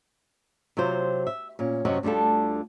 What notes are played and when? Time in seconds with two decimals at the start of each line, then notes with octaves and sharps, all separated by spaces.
0.77 C3 F#3 F4 C5
1.27 E5
1.59 A#2 C#4
1.85 F#2 C3 C4 F#4 C#5 D#5
2.03 D2 D3 G3 F4 A4